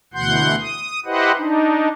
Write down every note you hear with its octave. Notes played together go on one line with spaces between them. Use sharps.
D2 B2 E3 F#5 C6 G6
D#6
E4 G4 B4 C5 D#5 F#5
D4 D#4